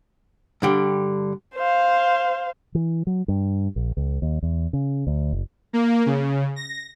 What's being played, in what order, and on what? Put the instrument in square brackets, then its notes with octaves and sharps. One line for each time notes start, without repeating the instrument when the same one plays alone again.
[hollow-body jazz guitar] G2 D3 G3
[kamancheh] C5 F5
[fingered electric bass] E3
F#3
G2
A#1
C#2
D#2
E2
C#3
D2
F#1
[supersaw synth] A#3
C#3
A#6